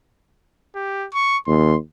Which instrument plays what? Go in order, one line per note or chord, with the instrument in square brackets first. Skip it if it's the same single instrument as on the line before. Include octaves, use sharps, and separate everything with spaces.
[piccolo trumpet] G4
C#6
[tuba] D#2 [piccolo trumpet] C6